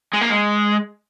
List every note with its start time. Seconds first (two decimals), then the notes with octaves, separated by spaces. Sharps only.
0.14 G#3
0.22 A#3
0.30 G#3